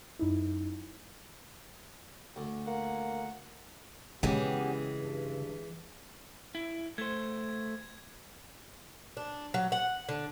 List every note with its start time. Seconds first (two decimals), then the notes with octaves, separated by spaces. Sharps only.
0.19 F#2 D#4 E4
2.36 D2
2.67 A#3 F#5
4.23 C#3 E3 G#3 B3 C#4 G4
4.96 G2
6.55 E4
6.98 A3 C5 G#6
9.17 D4
9.54 F#3
9.72 F#5
10.09 D3